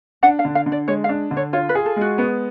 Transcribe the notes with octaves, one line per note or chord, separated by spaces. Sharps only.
D4 F#5
F5
D3
F5
D3
D5
G#3 C#5
F5
D4
D3
C#5
F4 C#5
B4
G#4
A4
G#3 F#4
B3